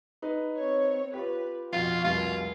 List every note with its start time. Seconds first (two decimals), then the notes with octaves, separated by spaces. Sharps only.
0.22 D#4 B4
0.56 C4 C#5
1.13 F4 G4 B4
1.73 F2 B2 F4 F#4 F5
2.04 F1 C2 F4